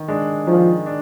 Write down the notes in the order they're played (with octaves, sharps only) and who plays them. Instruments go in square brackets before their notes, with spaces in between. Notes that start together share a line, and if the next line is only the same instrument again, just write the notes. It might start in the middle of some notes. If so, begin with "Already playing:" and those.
Already playing: [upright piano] D#3
G#3 D4
[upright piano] D#3 [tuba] F3
[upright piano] D4